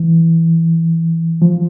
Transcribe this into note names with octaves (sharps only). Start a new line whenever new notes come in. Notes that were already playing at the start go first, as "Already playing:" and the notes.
Already playing: E3
F3